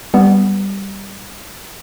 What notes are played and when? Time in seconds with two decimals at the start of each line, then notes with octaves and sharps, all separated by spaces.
0.14 G3 B3